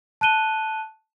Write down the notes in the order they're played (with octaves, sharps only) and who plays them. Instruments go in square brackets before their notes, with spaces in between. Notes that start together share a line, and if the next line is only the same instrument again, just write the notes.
[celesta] A5 F#6 D#7 G7